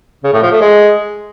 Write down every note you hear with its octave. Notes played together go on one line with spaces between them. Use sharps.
C#3
A2
F3
A3
G#3